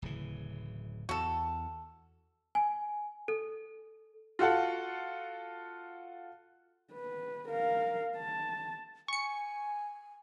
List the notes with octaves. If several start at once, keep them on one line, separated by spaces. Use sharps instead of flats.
D1 C#3 E3
E2 F#4 A4
G#5
A4
F4 F#4 A4 F#5
B4
A#4 F5
A5
G#5 C#6 C#7